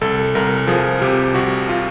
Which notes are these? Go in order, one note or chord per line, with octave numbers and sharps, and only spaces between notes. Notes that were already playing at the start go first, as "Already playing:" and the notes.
C2 A4
C2 A#4
F3 G#4
C3 G4
C2 F#4
F4